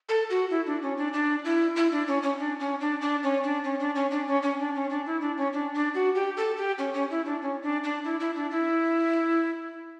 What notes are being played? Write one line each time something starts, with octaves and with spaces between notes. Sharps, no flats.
A4
F#4
E4
D4
C#4
D4
D4
E4
E4
D4
C#4
C#4
D4
C#4
D4
D4
C#4
D4
C#4
D4
C#4
D4
C#4
C#4
D4
C#4
D4
E4
D4
C#4
D4
D4
F#4
G4
A4
G4
C#4
C#4
E4
D4
C#4
D4
D4
E4
E4
D4
E4